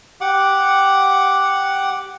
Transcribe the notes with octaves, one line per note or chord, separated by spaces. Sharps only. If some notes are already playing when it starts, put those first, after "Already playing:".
G4 F#5 D6